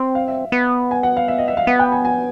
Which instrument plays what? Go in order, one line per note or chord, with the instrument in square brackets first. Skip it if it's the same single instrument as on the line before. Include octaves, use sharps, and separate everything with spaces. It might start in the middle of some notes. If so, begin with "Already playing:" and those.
Already playing: [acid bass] C4
[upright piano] F5
E5
[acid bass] B3
[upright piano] G#5
F#5
F5
E5
D#5
E5
F5
[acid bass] B3 [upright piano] F#5
[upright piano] G5
G#5
G#5